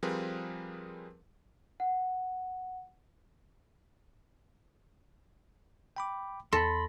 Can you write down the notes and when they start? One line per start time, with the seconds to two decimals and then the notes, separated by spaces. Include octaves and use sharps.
0.03 F3 G3 C4 G#4 A#4 B4
1.80 F#5
5.96 G5 B5 D6
6.53 E2 A4 B5 C6 A#6